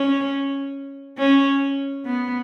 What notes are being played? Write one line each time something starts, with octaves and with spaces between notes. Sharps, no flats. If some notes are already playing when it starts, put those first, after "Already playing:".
Already playing: C#4
C#4
B3